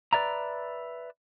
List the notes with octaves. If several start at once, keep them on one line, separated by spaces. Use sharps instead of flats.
B4 D5 E5 A#5